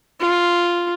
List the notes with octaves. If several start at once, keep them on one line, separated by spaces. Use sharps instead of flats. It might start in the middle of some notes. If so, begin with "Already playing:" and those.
F4